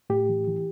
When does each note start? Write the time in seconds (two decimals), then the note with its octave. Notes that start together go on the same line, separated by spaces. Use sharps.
0.10 A2 G4
0.29 E3
0.47 E3